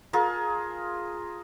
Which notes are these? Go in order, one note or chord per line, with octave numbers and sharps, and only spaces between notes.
F4 G#4 A#4 A5